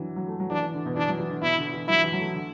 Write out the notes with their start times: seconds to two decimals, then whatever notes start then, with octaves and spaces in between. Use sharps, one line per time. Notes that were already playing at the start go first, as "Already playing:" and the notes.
Already playing: D3 E3 F#3
0.16 F#3
0.28 A3
0.40 F#3
0.50 E3 D4
0.62 E3
0.74 D3
0.86 B2
0.96 E3 D4
1.08 F#3
1.20 E3
1.31 D3
1.43 B2 E4
1.58 D3
1.73 E3
1.88 F#3 E4
2.04 E3
2.13 F#3
2.19 A3
2.34 D3